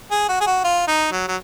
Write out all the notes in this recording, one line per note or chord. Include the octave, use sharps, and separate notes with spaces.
G#4
F#4
G#4
F#4
F4
D#4
F#3
F#3